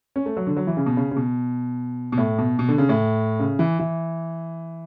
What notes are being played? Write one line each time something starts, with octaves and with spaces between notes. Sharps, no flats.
C#4
A3
F#3
D3
F#3
E3
C#3
B2
C#3
C#3
B2
B2
A2
B2
B2
D3
C#3
A2
C#3
E3
E3